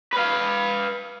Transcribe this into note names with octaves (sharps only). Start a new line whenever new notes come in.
B4 F5